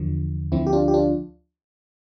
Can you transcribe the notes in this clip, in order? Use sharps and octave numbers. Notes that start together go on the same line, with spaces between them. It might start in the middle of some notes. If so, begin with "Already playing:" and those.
Already playing: E2 D3 F3
D2 D3 F3 C4 E4
G4
D4 F4
G4
D4 F4